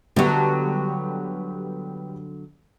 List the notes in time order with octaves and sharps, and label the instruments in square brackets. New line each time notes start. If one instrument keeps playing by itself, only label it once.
[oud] D3 F#3 [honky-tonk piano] G3 B3 G4